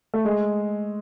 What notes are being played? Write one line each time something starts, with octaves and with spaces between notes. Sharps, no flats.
A3
G#3